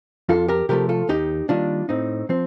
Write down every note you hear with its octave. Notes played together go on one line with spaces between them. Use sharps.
F2 F4 A4
G4 A#4
C3 F3 A3 G4 A#4
F4 A4
D#2 D#4 G4
D#3 G3 A#3 D4 F4
A2 C4 D#4
F3 C4